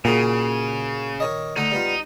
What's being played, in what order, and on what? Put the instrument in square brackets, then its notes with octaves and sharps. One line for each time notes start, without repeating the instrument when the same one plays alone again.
[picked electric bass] A#2 [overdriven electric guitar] C#3 [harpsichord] A#3 F#4 G#4
[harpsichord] D#3 C#5 D#5
[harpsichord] D2 D3 F#5 [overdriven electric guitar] D#4
[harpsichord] G3 B3 F4